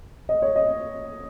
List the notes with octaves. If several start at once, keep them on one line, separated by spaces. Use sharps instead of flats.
D#5
C#5
D#5